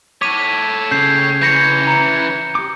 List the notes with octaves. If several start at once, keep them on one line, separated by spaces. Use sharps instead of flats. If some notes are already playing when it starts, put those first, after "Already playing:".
A4 C#5 D6 B6 D#7
C#3 G6 C7
E3 C#5 G6 A#6 C#7
A#5 C#7
G4 D6